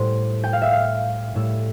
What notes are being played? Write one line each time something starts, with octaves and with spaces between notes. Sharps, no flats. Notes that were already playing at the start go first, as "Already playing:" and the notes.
Already playing: A2 G3 C5
G5
F5
E5
F5
A2 G3 E6